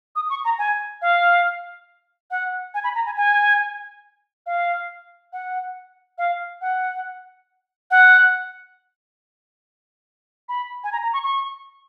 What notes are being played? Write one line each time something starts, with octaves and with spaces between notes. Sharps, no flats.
D#6
C#6
A#5
G#5
F5
F#5
G#5
B5
A#5
G#5
G#5
F5
F#5
F5
F#5
F#5
B5
G#5
A#5
A#5
C#6
C#6